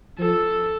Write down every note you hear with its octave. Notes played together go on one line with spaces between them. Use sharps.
F3 A4